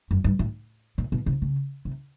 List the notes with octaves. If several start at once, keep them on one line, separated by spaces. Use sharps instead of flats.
F#2
G2
A2
A#2
B2
C3
C#3
C3